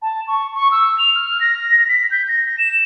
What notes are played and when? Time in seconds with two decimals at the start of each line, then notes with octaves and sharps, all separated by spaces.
0.02 A5
0.28 C#6
0.55 C#6
0.71 E6
0.98 F7
1.15 F6
1.41 A#6
1.89 B6
2.11 G6
2.28 A#6
2.58 E7